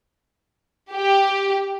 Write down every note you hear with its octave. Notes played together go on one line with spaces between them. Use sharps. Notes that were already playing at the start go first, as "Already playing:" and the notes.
G4